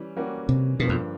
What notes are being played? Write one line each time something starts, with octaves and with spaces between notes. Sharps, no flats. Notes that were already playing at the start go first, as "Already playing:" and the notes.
Already playing: E3 G3 C#4
E3 G3 A#3 C#4 F#4
C3
G2 B2 D3 F3 A#3
F2